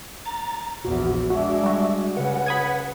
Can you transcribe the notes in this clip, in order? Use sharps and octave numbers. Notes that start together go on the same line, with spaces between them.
A#5 A6
A#1 E2 F#4
G#3 D4 F#4 E5
G3 F#4
C#3 B4 F#5
B5 D#6 G#6